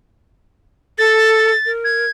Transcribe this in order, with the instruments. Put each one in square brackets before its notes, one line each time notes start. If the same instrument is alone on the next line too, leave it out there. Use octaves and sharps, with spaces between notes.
[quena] A4 [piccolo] A6
[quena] A#4
[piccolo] G#6